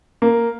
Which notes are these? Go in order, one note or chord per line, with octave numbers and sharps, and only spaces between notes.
A#3